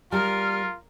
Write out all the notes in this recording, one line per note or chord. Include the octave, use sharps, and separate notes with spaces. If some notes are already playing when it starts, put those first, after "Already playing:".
G3 F4 A#4 F6